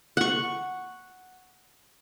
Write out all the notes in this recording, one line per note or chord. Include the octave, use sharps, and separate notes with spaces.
F#5 C#6